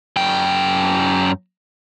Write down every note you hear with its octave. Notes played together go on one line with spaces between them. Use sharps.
F#2 G5